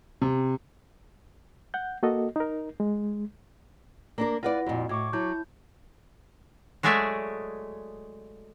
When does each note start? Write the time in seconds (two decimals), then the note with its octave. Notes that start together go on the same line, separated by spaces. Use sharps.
0.22 C3
1.74 F#5 G6
2.03 A#3 F#4 A4 D#5
2.36 D#4 A#4
2.80 G#3
4.18 A#3 D4 A#4
4.43 E4 F4 B4 D5 F#5 A#6
4.66 F2 A#2 F#4 D#5
4.89 A2 C#6 D6 G#6
5.13 F#3 E4 A5 G6
6.83 F#3 G#3 A3 G#4 D5 E5